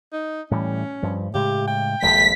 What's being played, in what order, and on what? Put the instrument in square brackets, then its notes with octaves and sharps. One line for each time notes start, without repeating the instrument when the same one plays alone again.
[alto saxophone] D#4
[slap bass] A2 E3 G3 [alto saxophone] C#4
[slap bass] G2 F3
[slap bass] A2 C#3 G#3 [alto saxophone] G4
[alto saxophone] G5
[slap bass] D#1 A#1 G#3 [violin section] B6